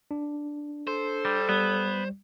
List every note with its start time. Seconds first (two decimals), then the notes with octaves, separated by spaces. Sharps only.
0.11 D4
0.87 A4 C5
1.25 G3
1.49 G3 B3